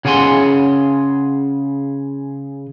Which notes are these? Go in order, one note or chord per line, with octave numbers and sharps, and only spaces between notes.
C#3 G#4 F#5 G#5 C6